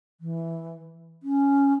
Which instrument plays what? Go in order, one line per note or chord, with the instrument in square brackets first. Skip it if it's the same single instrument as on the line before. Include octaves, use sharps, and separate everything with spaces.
[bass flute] E3
C#4